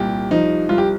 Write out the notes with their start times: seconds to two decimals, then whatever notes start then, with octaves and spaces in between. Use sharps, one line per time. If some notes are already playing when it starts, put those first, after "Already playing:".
Already playing: C2 A#2 G4
0.31 F3 D#4
0.69 C2 F4
0.78 G4